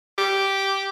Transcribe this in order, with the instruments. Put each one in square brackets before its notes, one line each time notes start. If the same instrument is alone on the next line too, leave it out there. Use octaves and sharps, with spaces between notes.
[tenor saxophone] G4